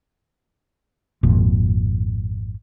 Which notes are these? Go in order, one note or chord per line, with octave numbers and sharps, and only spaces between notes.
G#1 F2 A#2